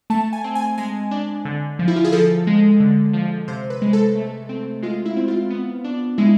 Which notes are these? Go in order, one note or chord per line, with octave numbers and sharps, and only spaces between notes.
A3 A5
G#5
C4
G#5
G#3 G#5
D4
D3
F3
E4
F4
G#4
F3 A4
G#3
D3
F3
C3 C5
B4
G#3
A4
A3
C4
G#3 F4
E4
C4
F4
B3
D4
G#3 E4